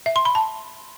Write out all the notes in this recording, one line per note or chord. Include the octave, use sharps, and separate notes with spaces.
E5
C6
B5
A5